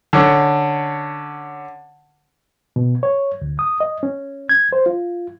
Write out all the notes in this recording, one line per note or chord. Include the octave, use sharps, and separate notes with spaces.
D3 C#4
B2
C#5
D2
D#6
D#5
C#4
G#6
C5
F4